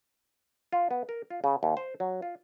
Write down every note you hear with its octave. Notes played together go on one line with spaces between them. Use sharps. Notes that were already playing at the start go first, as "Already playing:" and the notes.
F4
B3
A#4
F4
C#3
D#2
C5
F#3
F4